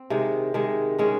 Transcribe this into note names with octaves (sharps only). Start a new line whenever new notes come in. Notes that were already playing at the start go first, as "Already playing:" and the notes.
Already playing: C4
C3 D#3 G#3
C3 D#3 G#3
D#3 G#3 C#4